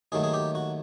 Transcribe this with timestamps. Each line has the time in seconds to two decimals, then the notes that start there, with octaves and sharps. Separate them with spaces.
0.12 D#2 D#3 F#3 A3 G#4
0.24 G#4
0.33 G4
0.55 F#4